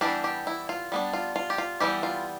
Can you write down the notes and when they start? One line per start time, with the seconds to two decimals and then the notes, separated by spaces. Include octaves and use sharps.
0.01 E3 G3 B3 D4 G4
0.24 G4
0.47 E4
0.69 F4
0.92 G3 B3 D4
1.13 F4
1.36 F4
1.50 G4
1.58 F4
1.80 E3 G3 B3 G4
2.03 F4